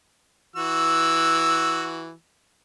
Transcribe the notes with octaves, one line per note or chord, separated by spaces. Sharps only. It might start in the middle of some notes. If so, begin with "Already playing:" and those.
E3 F#4 E6